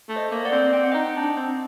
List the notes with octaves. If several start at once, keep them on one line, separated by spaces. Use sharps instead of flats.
A3
C5 D#5
A#3
D5 F#5
C4
C4 G5
F#5
D#4 D#5 G5
D4
C4